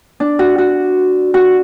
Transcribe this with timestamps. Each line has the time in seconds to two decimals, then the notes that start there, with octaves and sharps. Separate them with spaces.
0.20 D4
0.39 F#4
0.58 F#4
1.34 F#4